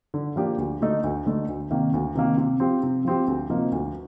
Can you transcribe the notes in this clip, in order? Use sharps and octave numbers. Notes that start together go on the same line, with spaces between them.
D3
F3 A#3 D4 G4
D2
D3 A3 D#4
D2
D3 A3 D#4
D2
C3 D#3 A#3
D2
C3 D#3 A#3
C3
F3 C4 G4
C3
F3 C4 G4
D2
C3 F3 A#3 D#4
D2